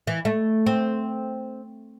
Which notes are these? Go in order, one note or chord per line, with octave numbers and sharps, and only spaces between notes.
E3
A3
C4